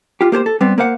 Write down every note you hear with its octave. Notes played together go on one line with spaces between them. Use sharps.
F4 G4
A#3 G4 G#4 C5
A4
G3 B3 C4
A#3 A#4 C5 F5 F#5